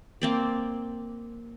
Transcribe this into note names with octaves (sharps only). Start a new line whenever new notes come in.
A#3 C4 D5